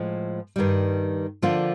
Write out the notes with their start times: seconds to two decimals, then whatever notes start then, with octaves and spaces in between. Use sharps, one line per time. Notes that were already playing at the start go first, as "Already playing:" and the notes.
Already playing: A2 F3 G#3
0.56 G2 D#3 G3
1.42 D3 F3 A#3 D4 F4